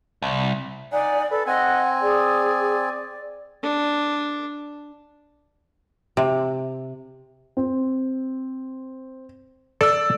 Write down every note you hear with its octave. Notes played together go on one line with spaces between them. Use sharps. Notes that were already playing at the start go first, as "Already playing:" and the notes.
C2
D#4 D5 F#5 G#5
A4 B4
C4 D#5 F#5 G#5
G#4 D5
D4
C3
C4
A4 D5 E6